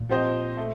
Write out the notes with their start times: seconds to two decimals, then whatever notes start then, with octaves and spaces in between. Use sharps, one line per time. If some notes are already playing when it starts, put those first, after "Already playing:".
Already playing: A#2
0.09 F3 C4 G4 C5 D#5
0.57 A3